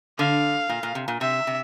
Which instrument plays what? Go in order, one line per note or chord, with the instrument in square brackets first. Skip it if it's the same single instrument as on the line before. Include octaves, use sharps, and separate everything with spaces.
[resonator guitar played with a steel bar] D3 [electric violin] F5
[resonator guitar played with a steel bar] A#2
A#2
C3
A#2
[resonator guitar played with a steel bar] C3 [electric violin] E5
[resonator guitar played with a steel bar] C3